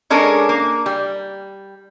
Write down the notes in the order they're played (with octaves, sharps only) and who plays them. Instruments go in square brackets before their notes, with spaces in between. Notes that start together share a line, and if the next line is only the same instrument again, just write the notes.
[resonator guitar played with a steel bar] G#3 C#4 D4 A4 A#4
A#3
G3